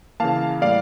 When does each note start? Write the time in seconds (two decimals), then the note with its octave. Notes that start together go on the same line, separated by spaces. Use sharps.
0.20 C#3 E3 A#3 F5 A5
0.61 A2 G3 A#3 D5 F5